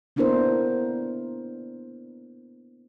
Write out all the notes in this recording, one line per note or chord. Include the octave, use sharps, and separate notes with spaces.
A#3 B3 D4 E4 A#4 C5